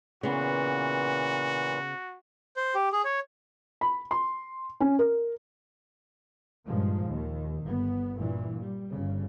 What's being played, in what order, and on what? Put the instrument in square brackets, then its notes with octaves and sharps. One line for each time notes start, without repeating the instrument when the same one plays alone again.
[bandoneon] A#2 E3 [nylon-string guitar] C#3 B3 [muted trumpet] F#4
[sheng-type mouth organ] C5
G4
G#4
C#5
[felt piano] B5
C6
C#4
A#4
[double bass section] G2 A#2 D#3 F3 G#3
D#2 D#3
G1 B3
G2 A#2 E3
G3
G1 C#3